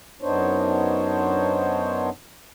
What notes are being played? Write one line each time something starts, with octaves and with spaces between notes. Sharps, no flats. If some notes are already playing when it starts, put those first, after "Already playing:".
F#2 B3 D4 D#4 C5 C#5